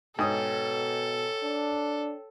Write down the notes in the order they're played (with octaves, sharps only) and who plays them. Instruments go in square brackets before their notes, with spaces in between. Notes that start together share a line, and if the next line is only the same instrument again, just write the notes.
[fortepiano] G#2 D#6 [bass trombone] B2 [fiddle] A4 [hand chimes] C#5 G5
[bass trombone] D4